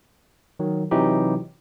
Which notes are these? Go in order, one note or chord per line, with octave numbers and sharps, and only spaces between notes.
D#3 F#3
C3 E3 F#3 D#4 E4 G4